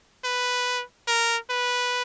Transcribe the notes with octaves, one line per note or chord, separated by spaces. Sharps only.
B4
A#4
B4